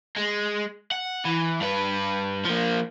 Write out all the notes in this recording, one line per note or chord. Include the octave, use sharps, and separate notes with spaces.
G#3
F#5
E3
G2 B4
F3 A#3